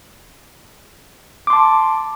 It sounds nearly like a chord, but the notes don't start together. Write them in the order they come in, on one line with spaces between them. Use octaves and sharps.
D6 C6 A5